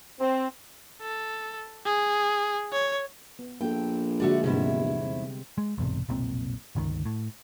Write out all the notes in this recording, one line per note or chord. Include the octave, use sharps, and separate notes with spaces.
C4
A4
G#4
C#5
B3
A#1 A#3 A4 G5
D3 G#3 A3 F#4 D5
E2 G#2 C3 G3 B3 E4
C4
G#3
B1 E2 G#2 C3
F1 B1 A#2 C4
G1 C#2 D#3
A2